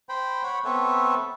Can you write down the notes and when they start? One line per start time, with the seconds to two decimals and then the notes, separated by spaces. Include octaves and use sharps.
0.09 C5 G5 B5
0.43 C#5 F#5 B5
0.65 B3 C4 A4 B4 C#5 E5